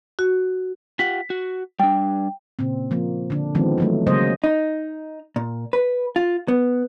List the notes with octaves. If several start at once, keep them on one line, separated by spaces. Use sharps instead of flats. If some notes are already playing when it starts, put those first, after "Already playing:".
F#4
F4 G4 F#5 B6
F#4
G3 D4 G5
A#2 C#3 C4
F3 A#3
D3 D4
D#3 F3 G#3 B3 C4
E3 F#3 A3
C#3 F#3 G#3 A#3 C5 D#5
D#4
A#2
B4
F4
B3